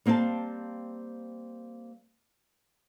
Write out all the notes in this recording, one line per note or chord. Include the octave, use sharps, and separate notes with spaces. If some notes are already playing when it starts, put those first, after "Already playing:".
G3 A#3 C4 F5 A5